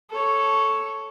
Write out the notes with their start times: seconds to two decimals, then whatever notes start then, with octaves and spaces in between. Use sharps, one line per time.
0.10 A4 C#5